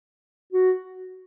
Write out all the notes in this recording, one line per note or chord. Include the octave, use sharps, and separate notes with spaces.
F#4